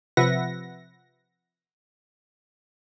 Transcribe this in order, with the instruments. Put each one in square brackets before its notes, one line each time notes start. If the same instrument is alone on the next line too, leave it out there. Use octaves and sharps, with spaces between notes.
[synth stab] C3 F3 B4 E5 F#5 A#6